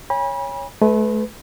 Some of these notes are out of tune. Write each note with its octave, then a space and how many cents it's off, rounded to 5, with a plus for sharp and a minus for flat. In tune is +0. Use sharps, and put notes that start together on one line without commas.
C#5 +0 G#5 -40 B5 -35
A3 -35 B4 +10